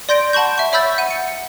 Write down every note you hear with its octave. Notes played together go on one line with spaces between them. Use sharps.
D5 C6 G6 A#6 D7
F#5 A5 B5 C#6 G6
E5 C#6
C#5 E5 B5 E6 G6 A6
F#5 D#7
C#7